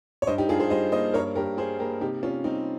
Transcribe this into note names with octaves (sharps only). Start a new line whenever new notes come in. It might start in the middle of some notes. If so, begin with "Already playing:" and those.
C#5
G2 C5 D#5
D#4 G4
G2 F4 G#4
G#4 C5
G3 C5 D#5
A#3 C5 D#5
G2 A#4 C#5
G2 G4 A#4
G3 G#4 C5
A#3 G4 A#4
C3 D#4 G4
C3 C#4 F4
G3 C4 D#4